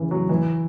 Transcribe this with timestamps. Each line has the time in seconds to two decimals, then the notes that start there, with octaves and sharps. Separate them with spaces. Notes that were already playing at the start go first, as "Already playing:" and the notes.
Already playing: C#3 E3
0.11 F#3
0.29 E3